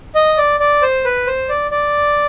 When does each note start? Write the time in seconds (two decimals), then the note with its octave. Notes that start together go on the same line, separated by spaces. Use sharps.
0.15 D#5
0.37 D5
0.60 D5
0.82 C5
1.05 B4
1.27 C5
1.49 D5
1.71 D5